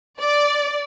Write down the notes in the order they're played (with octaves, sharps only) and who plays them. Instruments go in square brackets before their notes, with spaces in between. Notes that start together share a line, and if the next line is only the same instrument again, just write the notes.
[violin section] D5